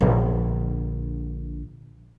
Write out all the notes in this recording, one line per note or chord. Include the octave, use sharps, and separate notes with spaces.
A#1 D3